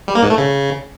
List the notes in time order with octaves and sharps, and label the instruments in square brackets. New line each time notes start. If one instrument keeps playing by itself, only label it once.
[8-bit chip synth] G3
A#3
G#2
A3
C#3